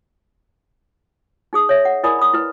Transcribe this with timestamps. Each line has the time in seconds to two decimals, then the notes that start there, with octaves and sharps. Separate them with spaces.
1.53 D#4 G#4 D#6
1.69 C#5 E5
1.85 F#5
2.04 E4 A#4 D5 G#5 B5 D#6
2.19 B5 D#6
2.33 E4 B4